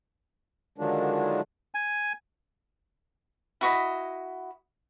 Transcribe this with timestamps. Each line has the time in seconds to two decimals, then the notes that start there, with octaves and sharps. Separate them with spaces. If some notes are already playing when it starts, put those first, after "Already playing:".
0.78 D3 D#3 F3 F#3 G#3 D4
1.75 G#5
3.61 E4 F#4 D#5 B5